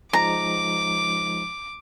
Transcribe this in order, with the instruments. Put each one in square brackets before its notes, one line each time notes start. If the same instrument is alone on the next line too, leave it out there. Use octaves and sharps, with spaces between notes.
[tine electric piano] F3 G#3 D#4 [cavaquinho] A#5 [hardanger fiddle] D6